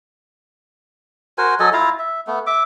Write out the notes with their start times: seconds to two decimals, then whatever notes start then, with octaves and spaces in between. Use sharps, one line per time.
1.38 F#4 A#4 C5 G#5
1.60 F#3 A4 D#5 G#5
1.73 E4 F4 F5 A#5
1.99 E5
2.27 A3 B3
2.46 E5 D6